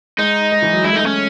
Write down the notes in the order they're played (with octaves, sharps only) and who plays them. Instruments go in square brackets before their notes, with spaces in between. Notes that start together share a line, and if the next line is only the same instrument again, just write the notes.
[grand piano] G#3 [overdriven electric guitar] D#4
[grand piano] G#3
E3
F#3
[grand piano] G#3 [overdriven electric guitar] E4
[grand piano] A3 [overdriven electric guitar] D#4
[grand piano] G#3
[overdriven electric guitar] C#4